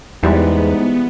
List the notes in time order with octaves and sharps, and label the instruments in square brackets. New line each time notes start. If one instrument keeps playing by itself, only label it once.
[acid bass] E2 [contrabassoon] G#2 [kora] E3 G3 G#3 [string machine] B3